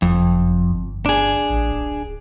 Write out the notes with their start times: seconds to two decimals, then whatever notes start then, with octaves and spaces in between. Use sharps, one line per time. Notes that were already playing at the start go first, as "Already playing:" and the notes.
0.02 F#1 F2
0.71 G1
1.06 D4 G#4
1.49 A1
1.71 D1